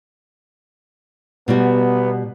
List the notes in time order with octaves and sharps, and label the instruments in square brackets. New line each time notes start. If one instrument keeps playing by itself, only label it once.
[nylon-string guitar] B2 G3 F#4 [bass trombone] B3